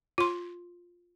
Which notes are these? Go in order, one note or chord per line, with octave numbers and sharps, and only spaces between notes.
F4 C6